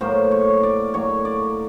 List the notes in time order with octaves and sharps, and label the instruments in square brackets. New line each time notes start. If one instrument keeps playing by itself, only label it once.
[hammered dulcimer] A2 F#3 A#3 C5
C#5
D5
A2 F#3 A#3 C#5
D5